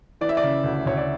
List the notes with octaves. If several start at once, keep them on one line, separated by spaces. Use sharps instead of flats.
E3 D5
E5
D5
C#3
D2
D2 C#5
D5